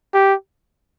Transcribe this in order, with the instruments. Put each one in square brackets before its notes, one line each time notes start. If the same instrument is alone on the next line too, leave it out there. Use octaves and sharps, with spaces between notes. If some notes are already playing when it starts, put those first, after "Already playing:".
[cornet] G4